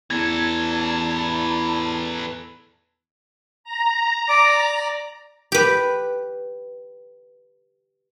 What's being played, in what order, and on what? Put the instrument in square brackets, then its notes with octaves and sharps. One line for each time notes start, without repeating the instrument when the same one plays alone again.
[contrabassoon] E2 [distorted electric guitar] E3 A4 [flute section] D5 A5 A#5 [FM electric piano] G#6
[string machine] A#5
[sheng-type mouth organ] D5 D6
[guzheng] G4 B4